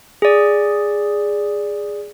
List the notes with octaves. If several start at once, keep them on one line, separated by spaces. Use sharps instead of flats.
G#4 D5